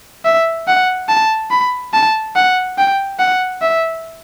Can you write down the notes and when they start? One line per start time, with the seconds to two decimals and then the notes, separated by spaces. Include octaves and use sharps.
0.25 E5
0.68 F#5
1.09 A5
1.51 B5
1.94 A5
2.36 F#5
2.78 G5
3.19 F#5
3.62 E5